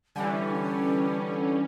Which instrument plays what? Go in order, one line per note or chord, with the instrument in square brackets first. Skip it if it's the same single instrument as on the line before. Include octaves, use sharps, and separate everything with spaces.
[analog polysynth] D3 E3 [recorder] G3 [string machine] C#4